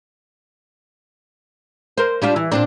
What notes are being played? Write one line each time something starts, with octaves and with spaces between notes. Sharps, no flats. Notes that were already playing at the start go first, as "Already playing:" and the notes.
A#4 C5
G3 D4 F4
E3
A#2 C4 D4